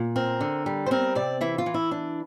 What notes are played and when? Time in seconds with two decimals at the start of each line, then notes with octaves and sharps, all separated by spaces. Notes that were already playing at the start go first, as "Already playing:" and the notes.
Already playing: A#2
0.16 C4 A#4
0.41 D3
0.66 G3
0.86 C5
0.91 C4 A#4
1.15 C3 D5
1.41 E3 E4
1.58 F4
1.66 E3
1.74 E4
1.91 D4